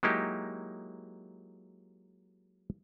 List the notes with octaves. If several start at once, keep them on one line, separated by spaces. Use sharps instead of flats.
F#3 G#3 A#3 D#4 E4 G4